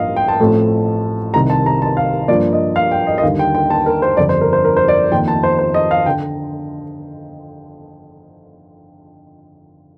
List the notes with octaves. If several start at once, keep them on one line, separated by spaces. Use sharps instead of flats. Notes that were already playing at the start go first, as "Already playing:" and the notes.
Already playing: A1 G2 F3 A#3 D#5 F5
G5
A5
A1 A2 F3 A3 C4
C2 C3 D#3 A#5
A5
A#5
A5
F5
G2 F3 A#3 D5
D#5
F5
G5
D#5
D#5
D#2 D3 G3 F5
G5
G5
A5
A#4
C5
G1 F2 D3 G3 D5
C5
A#4
C5
A#4
C5
D5
F2 D#3 A#3 G5
A5
C5
C5
D#5
F5
D3 G5